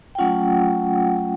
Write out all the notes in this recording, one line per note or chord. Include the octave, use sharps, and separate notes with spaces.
G5
F#3 A3 C#4 F4 F#5